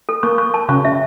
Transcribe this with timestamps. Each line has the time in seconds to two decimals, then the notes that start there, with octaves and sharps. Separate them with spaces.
0.09 A4
0.23 A#3 C#6
0.38 C#6
0.54 A5
0.69 C#3 C#6
0.85 E5